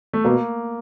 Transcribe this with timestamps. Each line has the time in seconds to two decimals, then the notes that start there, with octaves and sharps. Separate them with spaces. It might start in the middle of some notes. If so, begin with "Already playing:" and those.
0.13 A3
0.25 B2 A#3